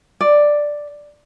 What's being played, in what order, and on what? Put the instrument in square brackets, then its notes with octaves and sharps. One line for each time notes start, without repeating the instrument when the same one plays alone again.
[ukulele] D5